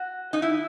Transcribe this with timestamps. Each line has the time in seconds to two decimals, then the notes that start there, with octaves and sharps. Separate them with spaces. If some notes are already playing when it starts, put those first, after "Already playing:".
Already playing: F#4
0.33 D#4
0.42 E4